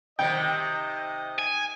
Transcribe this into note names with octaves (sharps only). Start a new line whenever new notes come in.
C3 D#3 D#5 G5
G#5